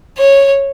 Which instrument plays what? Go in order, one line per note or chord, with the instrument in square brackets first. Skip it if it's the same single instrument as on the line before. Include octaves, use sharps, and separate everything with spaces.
[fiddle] C#5